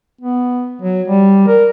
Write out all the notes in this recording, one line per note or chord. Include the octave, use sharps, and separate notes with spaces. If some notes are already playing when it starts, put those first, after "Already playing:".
B3
F#3
G3
A#4